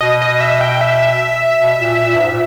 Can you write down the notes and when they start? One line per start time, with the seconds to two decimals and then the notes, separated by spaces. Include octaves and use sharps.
0.01 B2 D#5
0.22 D#5
0.41 E5
0.61 G5
0.81 E5
1.60 B2
1.80 A#2
2.00 A#2
2.15 G2
2.19 G#2
2.30 A#2